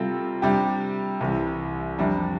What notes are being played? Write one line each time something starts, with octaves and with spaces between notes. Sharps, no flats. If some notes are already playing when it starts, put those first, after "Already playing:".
Already playing: C3 G3 C4 F4 A4
C3 G3 D4 G4
C2 C3 E3
F2 C3 G3 D4